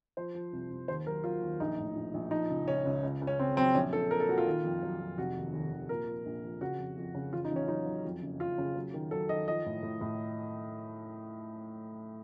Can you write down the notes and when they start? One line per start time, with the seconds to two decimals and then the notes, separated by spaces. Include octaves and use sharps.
0.17 F3 C5
0.35 F3
0.53 C2
0.70 C2
0.88 D#2 C5
1.07 F#3 A#4
1.24 F#3 F4
1.42 D#2
1.60 A#1 D#4
1.78 A2
1.96 A#1
2.14 A#1
2.31 F3 D#4
2.50 C#2
2.68 C#2 C#4
2.85 C#2
3.03 C#2
3.21 C#2
3.27 C#4
3.39 C#3 C4
3.57 F#3 C4
3.75 A#1 C#4
3.93 A#1 A4
4.11 A#2 A#4
4.20 A4
4.29 A#2 F#4
4.38 F4
4.47 D#3
4.64 F2
4.83 F#3
5.00 F2
5.18 F1 F#4
5.36 D#2
5.53 D#2
5.72 D#2
5.89 A#2 A#4
6.07 F3
6.26 A#1
6.44 F3
6.61 C#3 F#4
6.79 F2
6.97 F2
7.15 C#3
7.33 A1 F4
7.45 D#4
7.51 A1 C#4
7.68 F#3 D#4
7.86 F#3
8.05 F2
8.22 F#1
8.40 F#1 F4
8.58 C#3
8.75 F#3
8.94 D#3
9.11 F#3 A4
9.29 D#3 D#5
9.48 F3 D#5
9.66 A2
9.83 A2
10.01 A2